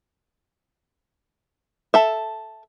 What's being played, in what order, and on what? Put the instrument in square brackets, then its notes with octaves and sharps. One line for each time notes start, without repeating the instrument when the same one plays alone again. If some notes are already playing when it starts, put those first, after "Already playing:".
[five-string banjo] A4 E5